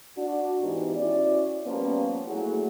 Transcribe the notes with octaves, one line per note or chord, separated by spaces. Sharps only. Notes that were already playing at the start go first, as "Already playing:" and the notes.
D4 F#4
G#2 E3 B3 D#4 G4
C#4 E4 F#4 D5
F3 G3 A#3 B3 C#4
F#3 A3 A#3 E4 F#4 G#4